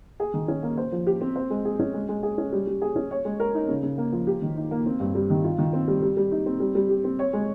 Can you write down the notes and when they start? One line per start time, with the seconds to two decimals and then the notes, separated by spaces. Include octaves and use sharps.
0.20 G#4
0.34 D#3
0.48 C#4
0.63 A#3
0.77 C5
0.92 F3
1.07 G4
1.21 C4
1.36 C5
1.50 G#3
1.65 G#4
1.79 C#4
1.94 G#3
2.09 G#3
2.23 G#4
2.38 C#4
2.52 G3
2.67 G3
2.82 G#4
2.96 C#4
3.11 C#5
3.25 G#3
3.40 A#4
3.54 D#4
3.69 C#3
3.83 C#3
3.98 A#3
4.12 F3
4.27 G4
4.42 D#3
4.57 D#4
4.71 A#3
4.86 C4
5.00 G2
5.15 G3
5.30 D#3
5.44 F4
5.58 D#3
5.73 C4
5.88 G3
6.02 G3
6.17 G3
6.31 D#4
6.46 C4
6.60 G3
6.75 G3
6.89 G4
7.04 C4
7.19 C#5
7.33 G#3